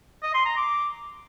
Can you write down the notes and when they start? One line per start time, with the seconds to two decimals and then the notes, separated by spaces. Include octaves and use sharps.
0.23 D#5
0.34 C6
0.45 A#5
0.57 D6